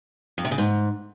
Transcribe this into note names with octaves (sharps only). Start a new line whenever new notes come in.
F2
C3
C#3
G#2